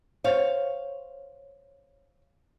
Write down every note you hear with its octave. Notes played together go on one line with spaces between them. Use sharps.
C5 C#5 F5